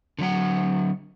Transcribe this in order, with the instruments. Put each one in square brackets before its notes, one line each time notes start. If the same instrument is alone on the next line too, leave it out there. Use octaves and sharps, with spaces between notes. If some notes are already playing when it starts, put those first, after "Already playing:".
[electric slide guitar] D3 F#3 F#5